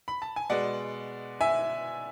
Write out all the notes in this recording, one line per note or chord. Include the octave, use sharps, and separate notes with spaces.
B5
A5
G#5
B2 G#3 D5 F#5
E5 G#5